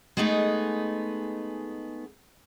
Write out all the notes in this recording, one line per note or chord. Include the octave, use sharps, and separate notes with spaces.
G#3 A3 B3 D#4 G#4